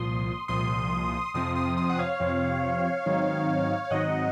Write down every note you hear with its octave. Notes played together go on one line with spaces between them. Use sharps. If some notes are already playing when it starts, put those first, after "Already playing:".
Already playing: C2 A#2 F3 C6 D#6
C2 A#2 F3 C6 D#6
F2 C3 F3 C4 C6 D#6
C6 D#6
C6 D#6
F#5
C#5 F5
F2 C3 F3 C4
G#2 D#3 F#3 C4 D#4
F5
G#2 D#3 F#3 C4 D#4 D#5 F#5